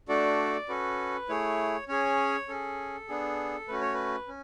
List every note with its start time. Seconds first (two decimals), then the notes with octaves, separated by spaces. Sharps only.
0.08 A3 D4 F#4 A4 D5
0.69 C#4 F#4 A4 B4
1.29 A3 E4 G#4 C#5
1.88 C#4 G#4 C#5
2.48 C#4 G#4 A4
3.08 B3 D4 G#4
3.68 A3 C#4 F#4 B4
3.81 C#5
3.94 B4
4.28 C#4